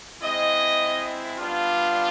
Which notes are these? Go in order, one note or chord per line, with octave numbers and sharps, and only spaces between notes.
G#3 C4 E4 D#5
G3 B3 D4 F4